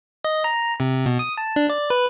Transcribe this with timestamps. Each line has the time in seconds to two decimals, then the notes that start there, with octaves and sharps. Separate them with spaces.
0.24 D#5
0.44 A#5
0.80 C3
1.06 B2
1.19 D#6
1.38 A5
1.56 D4
1.70 D5
1.90 B4